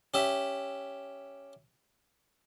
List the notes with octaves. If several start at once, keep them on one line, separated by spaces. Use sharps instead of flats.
C#4 G4 E5